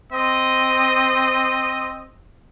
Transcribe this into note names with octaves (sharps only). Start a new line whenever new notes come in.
C4 D#5